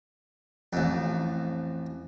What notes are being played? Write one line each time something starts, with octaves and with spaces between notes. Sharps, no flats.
A1 F2